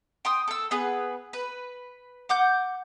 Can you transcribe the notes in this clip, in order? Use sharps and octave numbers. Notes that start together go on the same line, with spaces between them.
G5 C6 D#6
A4 E6
B3 G#4 B4
B4
F#5 D6 G6